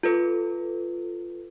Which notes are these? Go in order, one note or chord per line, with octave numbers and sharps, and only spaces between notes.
F4 A4 B4